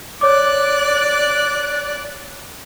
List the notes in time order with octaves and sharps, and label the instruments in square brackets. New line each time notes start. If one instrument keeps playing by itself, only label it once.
[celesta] C#5 D6 [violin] D5 F#6